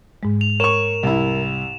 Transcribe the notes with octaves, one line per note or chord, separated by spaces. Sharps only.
G#2 G#3
F7
A#4 C#5 C#6 E7
C2 E4